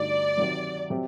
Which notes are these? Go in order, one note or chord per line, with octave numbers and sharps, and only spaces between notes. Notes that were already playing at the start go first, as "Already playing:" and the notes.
Already playing: G2 D3 A3 D#4 F#4 D5
C3 D#3 F#3
C3 F#3 C4 G4